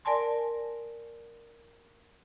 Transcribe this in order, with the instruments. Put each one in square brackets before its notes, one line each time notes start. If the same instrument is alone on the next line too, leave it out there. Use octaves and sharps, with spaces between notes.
[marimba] A#4 D5 G#5 A5 C6